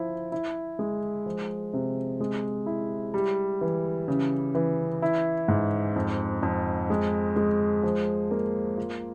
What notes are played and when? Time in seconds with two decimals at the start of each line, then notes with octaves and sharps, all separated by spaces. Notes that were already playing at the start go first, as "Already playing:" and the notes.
Already playing: F3 E4
0.32 E4
0.79 G#3
1.26 F3
1.74 C3
2.20 G#3
2.66 E4
3.14 G3
3.61 E3
4.08 C#3
4.55 E3
5.02 E4
5.48 G#2
5.96 F2
6.43 F2
6.90 G#3
7.36 G#3
7.83 F3
8.31 A#3
8.77 F4